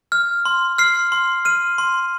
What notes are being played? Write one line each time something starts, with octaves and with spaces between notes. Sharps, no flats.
F6
C6
F6 C7
C6
F6 D#7
C6